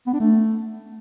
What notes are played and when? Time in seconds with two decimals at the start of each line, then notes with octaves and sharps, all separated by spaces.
0.07 B3
0.13 D4
0.20 A3